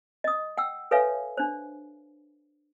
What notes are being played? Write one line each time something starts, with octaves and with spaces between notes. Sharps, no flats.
D#5 D#6
F#5 G5 E6
A4 B4 C#5 E5 F5 G#5
D4 C5